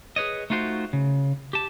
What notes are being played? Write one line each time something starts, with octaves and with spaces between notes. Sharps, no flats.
G#4 B4 C#5 D#5
A3 D#4 F4 F#4 C5
C#3
G4 A5